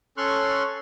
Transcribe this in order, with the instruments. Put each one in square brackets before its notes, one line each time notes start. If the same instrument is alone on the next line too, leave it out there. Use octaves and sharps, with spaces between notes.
[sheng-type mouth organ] C#4 A4 C6 C#6 F6 F#6